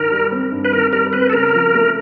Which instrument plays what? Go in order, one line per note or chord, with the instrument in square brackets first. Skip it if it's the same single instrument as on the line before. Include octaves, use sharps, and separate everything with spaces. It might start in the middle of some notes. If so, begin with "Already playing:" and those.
Already playing: [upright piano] G2 D#3 [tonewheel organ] A#4
[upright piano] G3
C4
G2
[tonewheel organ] B4
[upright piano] D#3 [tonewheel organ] A#4
[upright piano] G3 [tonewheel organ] A#4
[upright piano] C4 [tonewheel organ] B4
[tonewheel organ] A4
[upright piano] C#3 [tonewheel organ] A#4
[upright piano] F3
A3